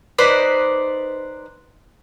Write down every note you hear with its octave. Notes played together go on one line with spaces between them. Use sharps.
D#4 B4 C5 D5